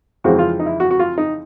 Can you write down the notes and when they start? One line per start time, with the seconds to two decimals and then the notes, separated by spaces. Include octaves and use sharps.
0.24 F2 C#3 E3 G#3 C4 F#4
0.39 F4
0.60 D#4
0.66 E4
0.80 F#4
0.91 F#4
0.99 F4
1.18 D#4